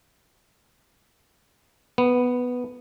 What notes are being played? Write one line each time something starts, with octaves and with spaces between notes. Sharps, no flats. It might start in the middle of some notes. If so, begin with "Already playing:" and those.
B3